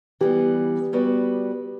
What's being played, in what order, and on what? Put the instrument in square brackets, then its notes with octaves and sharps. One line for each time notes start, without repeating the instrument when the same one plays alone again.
[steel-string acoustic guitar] E3 G3 B3 [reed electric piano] G4
[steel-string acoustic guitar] G3 B3 F#4 B4 D5